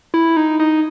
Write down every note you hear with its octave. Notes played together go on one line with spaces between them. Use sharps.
E4
D#4
D#4